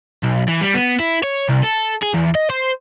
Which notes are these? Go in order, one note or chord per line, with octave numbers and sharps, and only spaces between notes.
B1
E3
G3
B3
E4
C#5
C2
A4
G#4
E2
D#5
C5